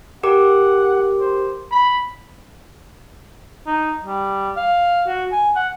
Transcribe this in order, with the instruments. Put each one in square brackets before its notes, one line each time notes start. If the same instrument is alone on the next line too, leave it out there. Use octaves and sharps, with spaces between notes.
[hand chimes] G4 A#4 D6 [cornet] F#5
[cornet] C5
B5
[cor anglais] D#4
G3
F5
F#4
G#5
F#5